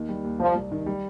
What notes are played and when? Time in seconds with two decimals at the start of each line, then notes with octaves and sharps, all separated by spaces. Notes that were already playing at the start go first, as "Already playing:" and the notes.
Already playing: D#2 D#3
0.09 G3
0.24 D#2
0.40 C2 F3
0.55 C2
0.71 D#3
0.86 G3